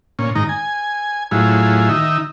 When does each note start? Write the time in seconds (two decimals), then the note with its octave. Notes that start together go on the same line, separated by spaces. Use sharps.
0.19 A#2 C#4
0.35 G#2 D#3 D#4 A#5
0.49 G#5
1.31 A2 F#3 E4 F4 G#4
1.89 D#3 D#4 E5